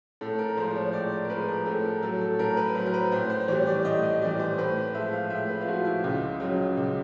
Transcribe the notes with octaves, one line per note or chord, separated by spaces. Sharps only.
A2 A4
A#4
F3 G#3 C5
C#5
A2 D5
A#4
F3 G#3 B4
A#4
A2 A4
A#4
F#3 A4
A4
A2 A#4
B4
F#3 C5
A#4
B4
A2 C5
C5
E3 G3 C#5
D5
A2 D#5
D#5
E3 G3 D5
C5
A2 B4
C5
F3 G#3 E5
F5
A2 E5
B4
F4
F3 G#3 F#4
E4
C#2 F4
C#3 F#3
C#2